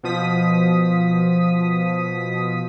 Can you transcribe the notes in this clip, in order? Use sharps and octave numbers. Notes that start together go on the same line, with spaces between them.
B2 F3 D#6 B6